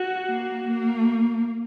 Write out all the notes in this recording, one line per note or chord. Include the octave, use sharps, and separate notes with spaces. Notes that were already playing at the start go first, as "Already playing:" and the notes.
Already playing: F#4
A#3
A#3